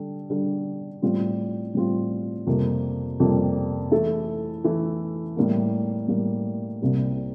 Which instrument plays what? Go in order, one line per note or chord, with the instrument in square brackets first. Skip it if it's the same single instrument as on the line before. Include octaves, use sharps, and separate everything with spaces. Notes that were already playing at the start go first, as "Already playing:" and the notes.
Already playing: [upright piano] D3 G3 D4 A4
D3 G3 D4 A4
A2 G3 C4 F4
A2 G3 C4 F4
F2 C3 G3 A#3
F2 C3 G3 A#3
E3 A3 E4 A4
E3 A3 E4 A4
A2 G3 A#3
A2 G3 A#3
C2 C3 G3 A#3